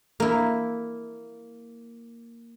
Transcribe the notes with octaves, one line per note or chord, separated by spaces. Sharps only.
A#3 E4